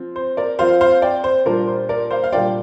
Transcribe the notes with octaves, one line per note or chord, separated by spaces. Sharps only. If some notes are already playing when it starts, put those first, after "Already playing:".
Already playing: F3 C4 F4
C5
A#4 D5
F3 C4 F4 C5 F5
C5 F5
D5 G5
C5
A#2 G3 A#3 D4 F4 A#4
C5
A#4 D5
C5 F5
F5
A#2 G3 A#3 D4 F4 D5 G5